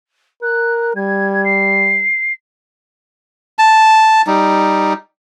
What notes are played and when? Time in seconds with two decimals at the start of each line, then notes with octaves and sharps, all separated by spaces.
0.43 A#4 F#6
0.96 G3 G#6
1.45 C7
3.59 A5
4.27 G3 D#4